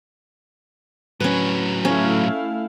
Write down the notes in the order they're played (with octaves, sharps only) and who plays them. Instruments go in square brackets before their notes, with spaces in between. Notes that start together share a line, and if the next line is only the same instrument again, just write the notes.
[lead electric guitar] A2 F#3 [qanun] C#4 B4
[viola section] A3 E4 F5 [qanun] C#4